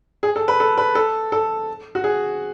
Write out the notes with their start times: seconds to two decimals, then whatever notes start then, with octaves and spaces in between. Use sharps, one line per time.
0.23 G#4
0.36 A4
0.48 B4
0.60 A4
0.78 B4
0.95 A4
1.32 A4
1.95 F#4
2.04 G#4